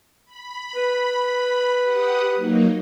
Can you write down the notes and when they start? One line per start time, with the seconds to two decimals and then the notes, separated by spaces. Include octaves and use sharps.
0.25 B5
0.76 B4
1.84 G4 F#5 D#6
2.35 F#3 A#3 D#4